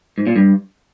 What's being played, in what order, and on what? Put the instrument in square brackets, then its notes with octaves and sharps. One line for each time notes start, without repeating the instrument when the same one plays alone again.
[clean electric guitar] G#2
A#2
G2